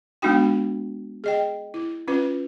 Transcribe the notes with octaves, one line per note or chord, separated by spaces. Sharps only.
G#3 B3 D4 D#4 F#4 G5
G#4 D#5 G5
E4
C#4 F4 B4